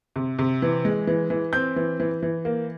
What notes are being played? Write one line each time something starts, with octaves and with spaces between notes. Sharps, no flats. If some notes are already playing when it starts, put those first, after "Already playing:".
C3
C3
E3
G#3
E3
E3
C4 G6
E3
E3
E3
A#3